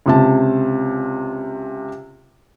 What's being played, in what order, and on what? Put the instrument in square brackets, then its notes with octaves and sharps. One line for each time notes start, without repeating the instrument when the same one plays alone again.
[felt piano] C#2 C3 A5